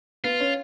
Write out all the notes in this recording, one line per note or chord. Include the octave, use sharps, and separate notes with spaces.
B3 F4 B4
C#4 C#5